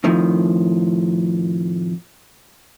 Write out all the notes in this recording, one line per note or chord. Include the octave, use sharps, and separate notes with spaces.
F2 A2 D#3 F3